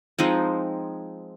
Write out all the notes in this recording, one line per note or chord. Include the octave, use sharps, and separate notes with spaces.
F3 G#3 C4 D#4